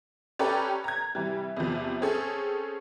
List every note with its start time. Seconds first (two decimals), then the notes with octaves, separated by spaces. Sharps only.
0.39 C#4 G4 A4 B4 D5 A#5
0.84 A#5 G#6
1.15 C3 E3 G3
1.57 E2 C3 F3
2.01 C4 C#4 G#4 A4